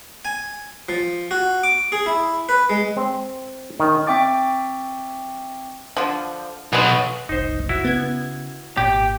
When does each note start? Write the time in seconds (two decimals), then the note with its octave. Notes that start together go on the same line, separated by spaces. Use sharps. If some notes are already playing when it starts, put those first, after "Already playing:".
0.25 G#5
0.89 F3
1.31 F#4
1.64 D6
1.92 G#4
2.06 E4
2.49 B4
2.70 G#3
2.97 C4
3.80 D#3
4.07 C4 E5 G5 C#6 D6 A6
5.97 D3 F3
6.73 B1 F#3 G#3 B3
7.29 F#1 C2 D#4 C5
7.69 E4 F#4
7.85 C#3 B3 G#6
8.77 G#1 A#2 G4